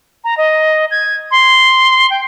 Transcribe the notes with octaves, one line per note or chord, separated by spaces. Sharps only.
A#5
D#5
G#6
C6
G5